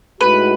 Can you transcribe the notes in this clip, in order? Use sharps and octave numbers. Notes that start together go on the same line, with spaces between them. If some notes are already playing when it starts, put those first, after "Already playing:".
A2 G#3 D#4 F#4 B4